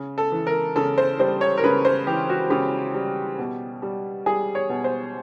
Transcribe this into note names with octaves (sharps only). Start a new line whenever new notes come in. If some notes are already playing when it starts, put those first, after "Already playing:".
Already playing: C#3
A4
E3
A#4
C#3 A4
C5
G3 C5
C#5
A#4
C#3 B4
C5
E3 G4
F#4
C#3 G4
G3
B2
G3
G3 G#4
C#5
B2
C5